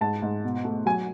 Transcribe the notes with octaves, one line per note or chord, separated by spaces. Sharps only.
G#2 A5
G#2
B2
A3
F#3 G#5